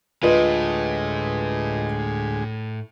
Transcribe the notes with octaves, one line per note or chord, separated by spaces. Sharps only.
D2 A2 G#3 F4 G#4 B4 D#5